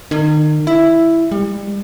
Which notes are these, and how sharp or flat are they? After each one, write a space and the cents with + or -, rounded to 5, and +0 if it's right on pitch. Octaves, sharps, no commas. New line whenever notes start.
D#3 -35
E4 +5
G3 +35